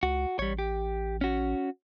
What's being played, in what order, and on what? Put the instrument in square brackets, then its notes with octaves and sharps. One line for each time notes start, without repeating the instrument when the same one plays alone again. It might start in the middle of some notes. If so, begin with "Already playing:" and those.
[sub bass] C#2 [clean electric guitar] F#4
[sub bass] A1 [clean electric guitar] G3 C#5
[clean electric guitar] G4
C#4 F#4